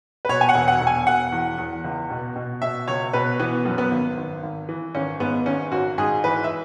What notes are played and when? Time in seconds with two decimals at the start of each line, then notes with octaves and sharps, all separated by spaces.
0.25 B4
0.29 B2 C#5
0.41 G#5
0.49 F#5
0.55 E1
0.68 F#5
0.81 E1
0.87 G#5
1.07 E1 F#5
1.32 E2
1.59 E2
1.84 C#2
2.10 B2
2.36 B2
2.62 B2 E5
2.88 C#2 C#5
3.13 B2 B4
3.39 E3 B3
3.65 F#2
3.78 B3
3.91 G#1
4.17 G#1
4.43 G#1
4.69 E3
4.94 G#1 C#4
5.20 G#2 B3
5.46 G#1 C#4
5.72 G#1 F#4
5.98 G#2 G#4
6.24 E3 B4
6.44 E5